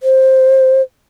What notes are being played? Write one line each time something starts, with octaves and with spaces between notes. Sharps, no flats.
C5